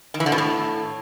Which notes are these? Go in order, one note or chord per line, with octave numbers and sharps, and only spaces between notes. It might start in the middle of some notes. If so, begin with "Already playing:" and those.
D#3
E3
D3
B2
A2